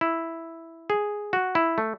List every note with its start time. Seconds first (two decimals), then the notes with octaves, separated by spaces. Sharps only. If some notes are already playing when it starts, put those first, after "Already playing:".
0.01 E4
0.90 G#4
1.33 F#4
1.55 E4
1.78 A3